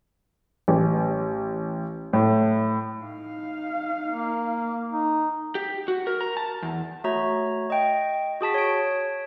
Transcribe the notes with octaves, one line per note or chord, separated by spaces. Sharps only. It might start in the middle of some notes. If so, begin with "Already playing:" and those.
A1
A2
D#4 F5
A#3
D#4
G4
F#4
A#4
A#5
A5
E2
A3 F#4 C#5 A#5
D#5 G5
F#4 G#4 A5 B6
C#5 D7